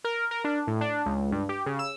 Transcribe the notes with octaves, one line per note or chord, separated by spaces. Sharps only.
A#4
A#4
D4
A2
D4
C#2
G2
G4
C#3
E6